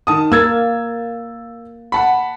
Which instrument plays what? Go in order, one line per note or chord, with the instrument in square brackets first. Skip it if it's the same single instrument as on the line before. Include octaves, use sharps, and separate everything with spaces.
[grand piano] D#3 A5 D#6
[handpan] A#3 A#4 [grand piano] E6 G#6 A6
[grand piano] F#5 A5 B5